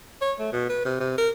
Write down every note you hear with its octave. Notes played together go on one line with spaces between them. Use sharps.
C#5
A3
B2
B4
C3
C3
A#4